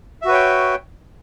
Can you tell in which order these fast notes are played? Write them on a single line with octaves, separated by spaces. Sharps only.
E5 F#4 B4 C#5 G5